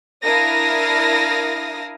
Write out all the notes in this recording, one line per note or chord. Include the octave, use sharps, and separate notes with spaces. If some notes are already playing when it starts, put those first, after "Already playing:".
D4 E4 A#4 F5 D#6 A#6